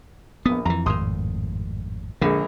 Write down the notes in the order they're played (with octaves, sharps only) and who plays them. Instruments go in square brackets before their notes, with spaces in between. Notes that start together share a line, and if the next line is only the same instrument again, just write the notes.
[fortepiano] A#1 D#6 [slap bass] B3
[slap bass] F2 E3 [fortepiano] A#5
[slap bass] G#1 F2 A2 [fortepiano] C6 D#6
[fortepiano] A#1 G#3 [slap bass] D3